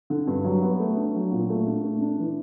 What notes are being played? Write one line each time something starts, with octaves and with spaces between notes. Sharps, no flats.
D3
G2
F#3
B3
A3
D4
F#3
A#2
A3
D4
A3
D4
E3